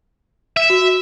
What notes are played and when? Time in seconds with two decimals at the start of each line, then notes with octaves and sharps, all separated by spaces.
0.57 E5
0.70 F#4